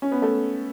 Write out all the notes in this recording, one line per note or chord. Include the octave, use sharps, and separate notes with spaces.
C#4
B3
A3